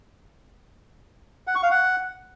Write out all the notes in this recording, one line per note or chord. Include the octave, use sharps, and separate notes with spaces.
F#5
C#6
F5
F#5